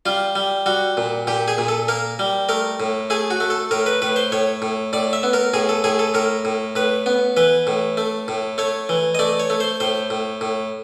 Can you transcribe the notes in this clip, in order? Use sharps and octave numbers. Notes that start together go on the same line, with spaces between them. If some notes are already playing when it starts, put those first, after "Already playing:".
G3 F4
G3
G3 F#4
A#2
A#2 G4
G#4
A#2
A4
A#3 A#4
G3
A3 A#4
A2
A3 G#4
F#4
A3
A4
A2 A#4
B4
A2 B4
C5
A2 C#5
A2
A2 D5
E5
B3
A#4
A2 G#4
A4
A2 G#4
A4
A2 A#4
A2
A2 B4
B3
E3 B4
A2
A3
A2
A3 C#5
E3
D#5
A3 D5
C#5
A3
C5
A2 C5
A2
A2